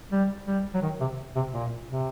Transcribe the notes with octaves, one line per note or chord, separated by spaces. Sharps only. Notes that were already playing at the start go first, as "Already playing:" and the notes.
G3
G3
F#3
D#3
C3
C3
A#2
C3